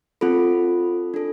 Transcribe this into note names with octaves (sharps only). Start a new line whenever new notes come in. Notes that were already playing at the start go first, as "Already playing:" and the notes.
C4 F4 A4 B5
D4 A4